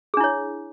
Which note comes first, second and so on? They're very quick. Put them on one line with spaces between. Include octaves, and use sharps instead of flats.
G#4 D4 E4 C#5